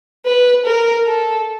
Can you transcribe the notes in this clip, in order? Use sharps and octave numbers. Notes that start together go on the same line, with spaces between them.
B4
A#4
A4